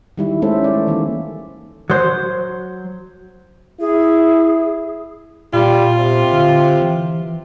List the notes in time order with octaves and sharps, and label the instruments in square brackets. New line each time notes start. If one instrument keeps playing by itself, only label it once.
[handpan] D#3 G3 E4
G#3 A3 C#4 A4 C5 E5
D5
D#3 E3 A#3
[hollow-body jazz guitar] F#3 C5
[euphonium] E4 [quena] G#4
[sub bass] A#2 [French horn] G3 [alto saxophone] F4
[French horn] C3
[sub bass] D3
E3